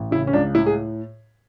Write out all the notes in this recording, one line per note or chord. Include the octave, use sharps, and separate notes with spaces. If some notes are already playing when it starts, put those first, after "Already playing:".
Already playing: A1
C#3 E4
C#4
C#2 D4
A2 E4
G#4